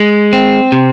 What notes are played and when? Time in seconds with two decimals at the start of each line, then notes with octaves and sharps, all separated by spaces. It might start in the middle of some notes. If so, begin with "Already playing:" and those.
Already playing: G#3
0.33 C4
0.72 C3